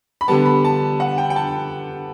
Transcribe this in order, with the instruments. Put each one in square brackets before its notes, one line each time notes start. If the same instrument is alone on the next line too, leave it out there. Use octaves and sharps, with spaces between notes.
[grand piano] B5
D3 G3 B3 A5
B5
A5
F#5
G5
G5
A5